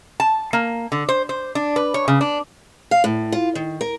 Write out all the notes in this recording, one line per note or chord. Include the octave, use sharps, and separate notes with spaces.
A5
A#3
D3
C5
C5
D4
B4
C#5
C#3
D4
F5
A2
F4
D#3
A#4